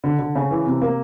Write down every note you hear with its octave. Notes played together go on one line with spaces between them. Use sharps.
D3
D3
C#3
E3
C3
A#3